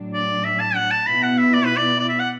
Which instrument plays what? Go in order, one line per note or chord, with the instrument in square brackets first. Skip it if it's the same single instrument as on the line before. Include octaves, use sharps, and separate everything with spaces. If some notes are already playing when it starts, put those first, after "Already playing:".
Already playing: [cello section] A2 F#3 D4
[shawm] D5
E5
A5
F#5
A5
[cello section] B2 B3 E4 [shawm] B5
[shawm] F#5
E5
D5
B4
D5
D5
E5
F#5